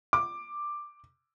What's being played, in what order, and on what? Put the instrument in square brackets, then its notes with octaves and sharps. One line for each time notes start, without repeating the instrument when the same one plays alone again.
[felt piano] D6